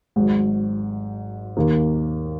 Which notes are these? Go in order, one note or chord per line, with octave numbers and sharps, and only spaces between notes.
G#1 G#2 F#3
D#2 D#3 A#3